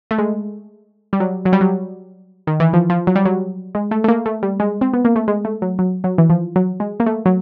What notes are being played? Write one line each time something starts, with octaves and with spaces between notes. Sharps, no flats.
A3
G#3
G3
F#3
F#3
G3
F#3
D#3
E3
F3
F3
F#3
G3
F#3
G#3
A3
A3
A#3
A3
G3
G#3
C4
B3
A#3
A3
G#3
A3
F#3
F#3
F#3
E3
F3
F#3
G#3
A#3
A3
F#3